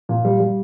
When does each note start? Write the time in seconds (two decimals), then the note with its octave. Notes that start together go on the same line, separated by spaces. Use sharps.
0.09 A#2
0.25 G3
0.40 G3